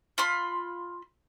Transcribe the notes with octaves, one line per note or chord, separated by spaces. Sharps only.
F4 B5 C6